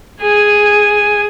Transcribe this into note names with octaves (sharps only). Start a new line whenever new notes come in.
G#4 G#5